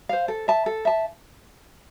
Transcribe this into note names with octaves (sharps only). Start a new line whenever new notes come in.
C5 F5
A4
E5 A5
A4
E5 A5